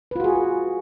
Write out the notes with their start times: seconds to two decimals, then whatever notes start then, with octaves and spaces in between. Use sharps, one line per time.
0.11 B4
0.16 F4
0.20 F#4
0.24 G#4